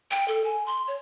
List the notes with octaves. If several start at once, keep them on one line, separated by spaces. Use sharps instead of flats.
G5
A4
G#5
C6
C#5